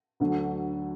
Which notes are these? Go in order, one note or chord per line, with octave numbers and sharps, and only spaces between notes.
D2 D3 F#3